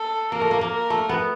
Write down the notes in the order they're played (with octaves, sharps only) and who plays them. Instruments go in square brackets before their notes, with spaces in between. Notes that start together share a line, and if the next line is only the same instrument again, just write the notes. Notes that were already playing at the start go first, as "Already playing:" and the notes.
Already playing: [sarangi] A4
[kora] A#3 [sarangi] A#4
[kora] A3
A#3
A#3
[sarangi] A#4
[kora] A3
B3